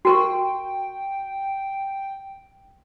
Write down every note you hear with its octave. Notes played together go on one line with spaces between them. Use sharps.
F#4 A#4 G5 C#6